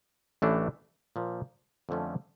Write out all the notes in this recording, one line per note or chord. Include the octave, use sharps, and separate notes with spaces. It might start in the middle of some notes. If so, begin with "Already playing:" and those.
A1 A2 E3 A3 D4
A#2 F3 A#3
F2 D3 F3 A3 C#4